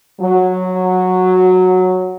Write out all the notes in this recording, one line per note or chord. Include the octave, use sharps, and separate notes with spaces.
F#3